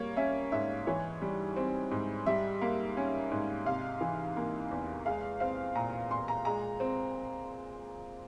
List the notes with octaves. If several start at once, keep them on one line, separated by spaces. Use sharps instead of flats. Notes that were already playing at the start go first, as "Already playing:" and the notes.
Already playing: G3 A#3 C#5
C#4 E5
G#2 E5
E3 C#5
G3
C4
G#2
G3 E5
A#3
C#4
G#2
C3 F5
E3
A#3
E2
G#3 F5
C4 F5
A#2 A#5
A#2 C6
A#5
G#3 A#5
C4